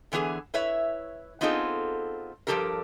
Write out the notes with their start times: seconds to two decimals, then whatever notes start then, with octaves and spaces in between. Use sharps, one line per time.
0.12 D3 E3 B3 F#4 G#4
0.54 E4 B4 C#5 E5
1.41 B3 C4 D#4 F4 G#4 A4
2.47 G2 D#3 F3 G4 A4 A#4